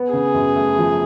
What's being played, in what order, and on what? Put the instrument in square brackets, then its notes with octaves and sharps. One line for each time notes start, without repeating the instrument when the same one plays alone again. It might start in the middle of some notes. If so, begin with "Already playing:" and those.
Already playing: [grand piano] B3
[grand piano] C#3 [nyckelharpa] G#4
[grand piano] F#2
A3
F3